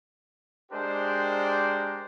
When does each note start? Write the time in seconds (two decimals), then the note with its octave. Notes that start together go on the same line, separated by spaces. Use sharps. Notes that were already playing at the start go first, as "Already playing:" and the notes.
0.72 G#3 D4 G4 A#4 C5 D5